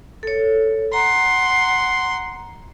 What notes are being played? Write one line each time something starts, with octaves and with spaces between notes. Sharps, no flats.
A4 C#5
F#5 A#5 C6